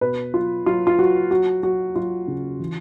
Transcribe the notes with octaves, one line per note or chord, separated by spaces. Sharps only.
B2 B4
F#3 F4
F#3 F4
F4
F#3 F#4
F#3 F#4
F#3 F#4
F#3 F4
C#3
E3